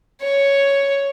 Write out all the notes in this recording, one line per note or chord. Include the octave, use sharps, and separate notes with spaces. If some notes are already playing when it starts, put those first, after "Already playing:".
C#5